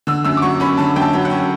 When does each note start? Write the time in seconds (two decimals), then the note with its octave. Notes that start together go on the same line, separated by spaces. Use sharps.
0.07 D3 E6
0.25 F#2 E6
0.37 D6
0.42 F#3 C#6
0.60 C#4 B5
0.77 D3 A5
0.96 F#2 G5
1.01 A5
1.13 F#3
1.25 F#5
1.31 C#4